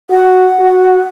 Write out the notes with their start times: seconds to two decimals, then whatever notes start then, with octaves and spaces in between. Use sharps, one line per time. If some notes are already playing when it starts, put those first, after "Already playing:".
0.10 F#4 F#5
0.60 F#4